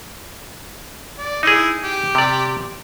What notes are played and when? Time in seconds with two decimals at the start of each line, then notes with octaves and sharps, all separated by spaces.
1.18 D5
1.43 D#4 E4 G#4
1.83 G4
2.15 C3 D5